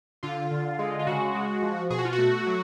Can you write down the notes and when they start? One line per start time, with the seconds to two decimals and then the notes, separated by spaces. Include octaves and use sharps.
0.23 D3 F4
0.51 D3
0.79 G#3
0.99 F4
1.07 C#3 F#4
1.35 G#3
1.62 F3
1.90 B2 G#4
1.98 F#4
2.05 F4
2.13 F#4
2.18 A3
2.47 F#3